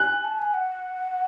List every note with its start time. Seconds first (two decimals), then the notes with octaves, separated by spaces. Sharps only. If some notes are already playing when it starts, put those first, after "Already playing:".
Already playing: G#5 F#6
0.24 A5
0.39 G#5
0.54 F#5